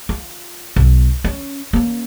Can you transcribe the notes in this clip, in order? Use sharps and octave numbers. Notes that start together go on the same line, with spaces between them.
F4
B1
C#4
A#3 C#4